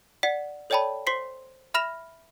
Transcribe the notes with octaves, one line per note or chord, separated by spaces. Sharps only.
D5 F#5 B6
A4 C#5 D5 G5 A5 B5
C5 C6 B6 C7
E5 B5 F6 A#6 E7 F7